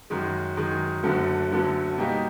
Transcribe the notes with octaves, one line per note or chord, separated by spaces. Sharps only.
F#2 D#3 G#3
F#2 D#3 G#3
F#1 F#2 D3 F#3 A3
F#1 F#2 D3 F#3 A3
B2 G3 A#3 D#4 G4